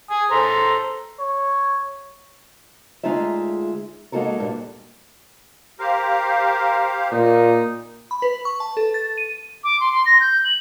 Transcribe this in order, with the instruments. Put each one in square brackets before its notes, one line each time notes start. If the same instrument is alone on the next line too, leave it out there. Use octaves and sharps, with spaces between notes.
[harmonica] G#5 D#6
A4 C5 A#5
[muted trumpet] C#5
[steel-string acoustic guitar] D2 G#3 D#4 F4 G#4 E5
G#3 A#3 D#4 F#4 A4 A#4
G2 A#2
[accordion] G4 C5 F5 [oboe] A#4
[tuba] A#2 [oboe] D#4
[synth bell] B5
B4
C#6
A5
A4
A6
D#7
[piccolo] D6
C6
C6
A#6
G6
F#7